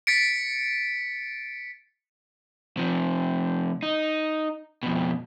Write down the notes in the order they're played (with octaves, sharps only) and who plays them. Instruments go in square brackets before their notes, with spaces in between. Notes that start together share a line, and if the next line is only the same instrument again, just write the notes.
[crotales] A6 B6 C#7 D7
[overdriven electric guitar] C3 F3
D#4
F2 B2